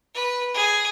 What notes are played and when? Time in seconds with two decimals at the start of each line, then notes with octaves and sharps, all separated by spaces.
0.14 B4
0.54 G#4